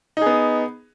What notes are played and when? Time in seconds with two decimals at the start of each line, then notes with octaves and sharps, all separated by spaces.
0.17 D#4
0.22 G#4
0.26 B3